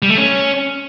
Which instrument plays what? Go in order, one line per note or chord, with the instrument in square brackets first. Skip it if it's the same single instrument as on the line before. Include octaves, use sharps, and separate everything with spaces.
[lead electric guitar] G3
A3
C#4